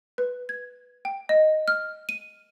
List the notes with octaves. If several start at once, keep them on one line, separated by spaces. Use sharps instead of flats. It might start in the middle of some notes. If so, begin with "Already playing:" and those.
B4
G#6
G5
D#5
F6
D#7